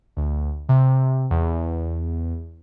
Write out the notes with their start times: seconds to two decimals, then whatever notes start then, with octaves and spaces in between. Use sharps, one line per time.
0.17 D2
0.69 C3
1.30 E2